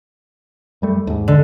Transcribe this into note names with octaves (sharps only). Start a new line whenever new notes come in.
F#2 G3 A3
D#2 G#2
D3